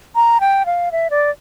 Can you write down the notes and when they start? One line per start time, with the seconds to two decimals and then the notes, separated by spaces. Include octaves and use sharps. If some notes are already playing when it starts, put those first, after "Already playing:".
0.15 A#5
0.40 G5
0.66 F5
0.92 E5
1.10 D5